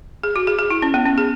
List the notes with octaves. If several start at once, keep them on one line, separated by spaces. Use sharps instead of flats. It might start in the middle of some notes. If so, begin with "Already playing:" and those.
G#4
F#4
G#4
G#4
E4
C#4
B3
C#4
G#4